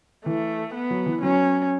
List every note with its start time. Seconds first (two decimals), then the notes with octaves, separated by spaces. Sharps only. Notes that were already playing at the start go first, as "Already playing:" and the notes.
0.26 E3 A3
0.74 B3
0.90 F#3
1.06 E3
1.22 F#3 C#4